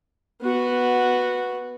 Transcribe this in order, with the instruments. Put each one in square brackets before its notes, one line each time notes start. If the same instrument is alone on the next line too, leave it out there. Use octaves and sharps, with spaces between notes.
[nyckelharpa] B3 F#4